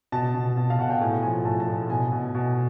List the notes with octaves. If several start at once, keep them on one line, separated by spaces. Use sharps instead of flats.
B2 A5
B2
B2
F5
B2 F#5
G5
A2 G#5
F3 G#5
A2 A5
G#5
A5
A2
B2 G#5
B2
B2